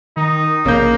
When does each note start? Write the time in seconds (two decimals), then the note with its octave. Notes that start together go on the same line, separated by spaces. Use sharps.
0.17 D#3 D#4
0.65 A#1 C#3 A#3 G6